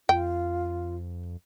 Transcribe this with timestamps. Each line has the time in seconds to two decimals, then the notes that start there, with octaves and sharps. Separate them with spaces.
0.09 F2 F4 G5